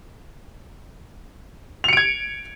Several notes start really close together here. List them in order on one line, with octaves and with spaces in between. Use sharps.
F7 C#7 D7 G#6